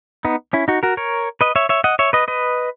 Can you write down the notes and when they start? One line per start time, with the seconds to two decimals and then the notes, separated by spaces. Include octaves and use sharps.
0.25 B3 D#4
0.53 C#4 E4
0.68 D#4 F#4
0.83 F#4 A#4
0.97 A#4 C#5
1.41 B4 D#5
1.56 C#5 E5
1.69 C#5 E5
1.84 D#5 F#5
1.99 C#5 E5
2.13 B4 D#5
2.28 B4 D#5